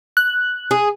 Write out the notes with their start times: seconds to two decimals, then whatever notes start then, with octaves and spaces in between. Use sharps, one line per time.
0.17 F#6
0.71 G#4